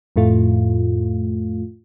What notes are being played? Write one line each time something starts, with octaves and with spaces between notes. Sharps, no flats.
F2 A2 A3 F4